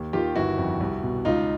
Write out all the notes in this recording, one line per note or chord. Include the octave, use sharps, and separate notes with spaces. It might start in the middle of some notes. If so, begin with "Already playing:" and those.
Already playing: D#2
D#3 F4 G4
G1 E4 F#4
F2
C2
B2
C#2 D#4 F4